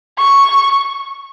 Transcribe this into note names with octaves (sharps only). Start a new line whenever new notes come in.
C#6